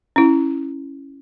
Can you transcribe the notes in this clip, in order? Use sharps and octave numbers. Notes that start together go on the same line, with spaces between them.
C#4 E4